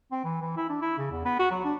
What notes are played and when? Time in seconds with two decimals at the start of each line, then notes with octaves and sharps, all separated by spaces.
0.12 C4
0.24 E3
0.41 E3
0.56 E4
0.69 D4
0.81 E4
0.98 C#3
1.11 E2
1.25 B3
1.39 F#4
1.51 F#3
1.64 D4